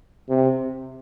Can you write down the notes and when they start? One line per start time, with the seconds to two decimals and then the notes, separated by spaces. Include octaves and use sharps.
0.29 C3